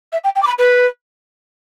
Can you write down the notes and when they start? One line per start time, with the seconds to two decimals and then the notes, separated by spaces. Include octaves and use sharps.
0.12 E5
0.24 G5
0.35 G5
0.42 D6
0.47 B5
0.58 B4